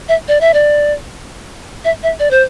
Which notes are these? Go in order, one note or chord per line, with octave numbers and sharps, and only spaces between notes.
E5
D5
E5
D5
E5
E5
D5
C5